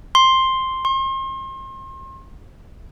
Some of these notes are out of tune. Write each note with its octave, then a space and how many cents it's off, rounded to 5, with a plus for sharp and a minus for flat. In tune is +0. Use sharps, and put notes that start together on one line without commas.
C6 +5
C6 +40